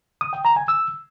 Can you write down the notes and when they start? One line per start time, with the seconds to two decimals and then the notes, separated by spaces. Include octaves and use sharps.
0.21 D#6
0.33 G5
0.45 A#5
0.56 G#5
0.68 E6